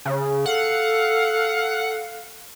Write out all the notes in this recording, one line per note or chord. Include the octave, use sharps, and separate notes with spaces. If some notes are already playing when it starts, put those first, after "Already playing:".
C#3
A4 F5 F#5